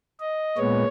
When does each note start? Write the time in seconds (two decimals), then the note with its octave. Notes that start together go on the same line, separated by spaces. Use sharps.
0.20 D#5
0.57 A#2 G#3 B3 C#5